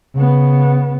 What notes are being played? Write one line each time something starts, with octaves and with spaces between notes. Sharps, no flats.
C#3 B3